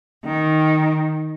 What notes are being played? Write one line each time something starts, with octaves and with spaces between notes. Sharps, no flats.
D#3